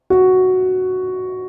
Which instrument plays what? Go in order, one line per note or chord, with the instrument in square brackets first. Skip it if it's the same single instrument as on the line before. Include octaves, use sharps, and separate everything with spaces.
[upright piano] F#4